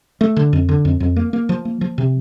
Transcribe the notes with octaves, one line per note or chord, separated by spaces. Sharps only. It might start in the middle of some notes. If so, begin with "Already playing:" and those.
A3
D3
F2
D3
F2
F2
A#3
A#3
F3
A#3
F3
C3